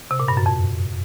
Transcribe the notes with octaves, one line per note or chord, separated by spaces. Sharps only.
C3
A#2
G2
F#2
F2